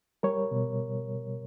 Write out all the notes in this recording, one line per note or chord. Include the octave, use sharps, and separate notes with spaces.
G3 A#4 C#5
B2